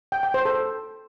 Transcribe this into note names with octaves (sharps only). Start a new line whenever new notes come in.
G5
G5
C5
A4